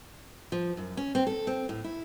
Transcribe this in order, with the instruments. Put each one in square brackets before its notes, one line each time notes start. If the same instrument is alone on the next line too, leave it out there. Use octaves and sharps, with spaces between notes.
[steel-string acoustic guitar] F3
F#2
C#4
C4
A4
C4
A2
E4